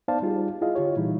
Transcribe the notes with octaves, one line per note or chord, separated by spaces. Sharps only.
B3 D#4 C5 D5 F5 A5
G3 D#4 F4 G4 G#4
E4 F4 G#4 D#5 F5
D3 F4 G4 C#5
A#2 E3 G3 D#4 E4